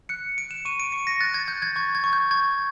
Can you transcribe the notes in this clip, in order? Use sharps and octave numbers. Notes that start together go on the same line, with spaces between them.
F#6 C#7
F#6 D7
E7
C#6 D#7
D7
C#6 C#7
A#6
F#6 A6
G#6
F#6 G6
G#6
C#6 G#6
G#6
C#6
G6
C#6 G#6